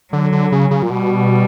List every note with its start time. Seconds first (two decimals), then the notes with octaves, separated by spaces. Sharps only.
0.13 D3 F#3
0.32 D3
0.52 C#3
0.71 C#3
0.83 A#2
0.90 B2 G3